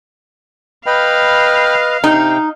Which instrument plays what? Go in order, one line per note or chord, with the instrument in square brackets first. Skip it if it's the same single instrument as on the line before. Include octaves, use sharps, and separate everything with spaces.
[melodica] B4 D#5 [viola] F5 [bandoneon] G5 B5
[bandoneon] C3 G5 [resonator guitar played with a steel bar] D#4